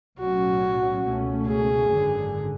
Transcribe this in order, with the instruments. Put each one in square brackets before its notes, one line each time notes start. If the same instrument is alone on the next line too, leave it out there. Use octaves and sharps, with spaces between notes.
[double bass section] B1 A2 F#3 C#4 [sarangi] F#4
[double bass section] C#2 B2 A3 C#4
[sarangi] G#4
[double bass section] G#1 F#2 D3